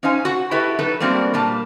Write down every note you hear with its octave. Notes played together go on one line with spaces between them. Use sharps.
C#4 D#4 C5 F5 G#5
F#4 F#5
E4 F#4 G4 A4 B4 E5
F#3 D#4 A4 B4
G3 A3 A#3 C4 D4 F#4
A#2 G3 A#3 A5